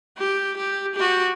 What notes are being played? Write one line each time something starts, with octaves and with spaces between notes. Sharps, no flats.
G4
G4
F#4 G4